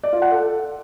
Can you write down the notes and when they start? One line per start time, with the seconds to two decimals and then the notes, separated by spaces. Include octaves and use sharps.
0.03 D5
0.13 F4
0.22 F#5
0.31 A4